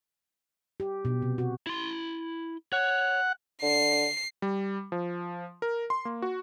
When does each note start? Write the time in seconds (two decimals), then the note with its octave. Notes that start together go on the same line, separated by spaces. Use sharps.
0.80 G4
1.05 B2
1.22 C3
1.38 F#4
1.67 E4 C6
2.72 C#5 F#5
3.62 D3 C7
4.42 G3
4.92 F3
5.62 A#4
5.90 C6
6.05 A#3
6.22 F#4